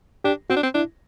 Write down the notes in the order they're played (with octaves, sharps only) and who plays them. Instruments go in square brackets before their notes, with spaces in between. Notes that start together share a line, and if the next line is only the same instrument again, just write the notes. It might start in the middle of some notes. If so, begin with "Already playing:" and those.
[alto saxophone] D4 [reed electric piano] G4
[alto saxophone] C4 [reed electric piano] F#4
[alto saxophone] D4
C4
[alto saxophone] D4 [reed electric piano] E4